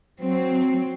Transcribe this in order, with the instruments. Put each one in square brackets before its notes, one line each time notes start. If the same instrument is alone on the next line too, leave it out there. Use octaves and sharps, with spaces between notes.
[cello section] F#3 C4